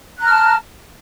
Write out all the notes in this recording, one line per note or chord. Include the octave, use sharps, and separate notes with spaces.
A5 A#5 F6 F#6